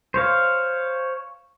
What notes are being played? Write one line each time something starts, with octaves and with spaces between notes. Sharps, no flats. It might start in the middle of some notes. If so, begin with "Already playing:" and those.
C5 C#5 F5